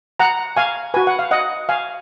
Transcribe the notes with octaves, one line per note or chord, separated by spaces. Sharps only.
F#5 A#5
F5 G#5
F#4 B4 G#5
F#5
F5
D#5 F#5
F5 G#5